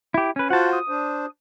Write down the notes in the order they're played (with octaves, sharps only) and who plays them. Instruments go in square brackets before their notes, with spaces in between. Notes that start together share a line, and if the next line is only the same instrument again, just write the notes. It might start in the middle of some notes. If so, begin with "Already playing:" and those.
[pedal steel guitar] E4 G4
C#4 B4
[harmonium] F4 F#4 C5 [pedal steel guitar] F#5 A5
[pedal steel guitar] D#6
[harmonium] D4 C5